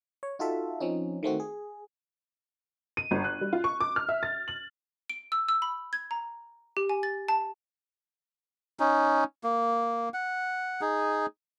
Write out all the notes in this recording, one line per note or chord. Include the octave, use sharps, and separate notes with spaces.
C#5
D#4 F4 F#4 A4 E5
F3 C4 C#4 D#4
D#3 A3 C4 F#4
G#4
D#7
G1
F#6
G3
F4
C#6
D6
F6
E5
A6
F#7
D7
E6
E6
B5
G#6
A#5
G4
G#5
A6
A5
C#4 D#4
A#3
F#5
D#4 G#4